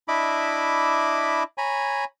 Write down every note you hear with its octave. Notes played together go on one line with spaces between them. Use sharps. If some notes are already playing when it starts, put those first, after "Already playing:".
D4 E4 D#5 E5 B5 D6
C#5 G#5 A#5 B5